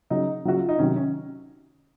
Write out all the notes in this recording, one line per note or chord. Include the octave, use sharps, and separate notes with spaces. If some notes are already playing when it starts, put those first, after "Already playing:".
C#3 F#3 D#4
C#3 F#3 F#4
F4
D#4
C3 D#3 F#3 C#4
C#4